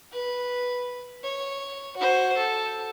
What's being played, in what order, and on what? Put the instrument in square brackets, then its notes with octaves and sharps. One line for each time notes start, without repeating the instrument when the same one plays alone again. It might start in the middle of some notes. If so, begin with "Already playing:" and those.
[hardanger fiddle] B4
C#5
F#4 C5
A4